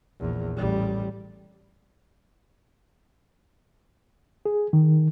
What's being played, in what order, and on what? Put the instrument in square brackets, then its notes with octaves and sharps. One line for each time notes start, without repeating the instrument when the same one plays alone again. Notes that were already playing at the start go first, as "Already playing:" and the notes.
[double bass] A#1 E2
A1 G3
[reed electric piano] G#4
D#3